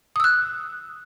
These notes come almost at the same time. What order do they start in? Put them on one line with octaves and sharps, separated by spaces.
D#6 E6 F#6